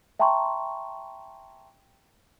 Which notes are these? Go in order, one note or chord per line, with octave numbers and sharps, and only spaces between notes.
E5 G5 A5 A#5 C6 C#6